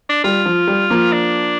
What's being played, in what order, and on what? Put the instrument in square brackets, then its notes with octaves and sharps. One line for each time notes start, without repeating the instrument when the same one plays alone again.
[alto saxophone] D4
[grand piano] G3 [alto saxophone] F4
[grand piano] F3
G3
F3 A#3
[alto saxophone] D4